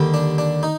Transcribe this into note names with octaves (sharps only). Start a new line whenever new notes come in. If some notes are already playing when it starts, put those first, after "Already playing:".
Already playing: D#2 D3 G3
D4
D4
D#4